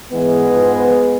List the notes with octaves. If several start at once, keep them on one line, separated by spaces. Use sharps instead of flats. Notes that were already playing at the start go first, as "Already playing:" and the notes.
G#2 E3 G#3 B3
G#2 F3